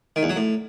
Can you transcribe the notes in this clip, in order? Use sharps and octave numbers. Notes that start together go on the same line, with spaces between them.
D#3
E2
F#3
A2